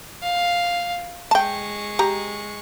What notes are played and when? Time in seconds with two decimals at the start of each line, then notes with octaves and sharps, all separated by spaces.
0.22 F5
1.31 G#3 G5 A5 C#6
1.99 G4 A#5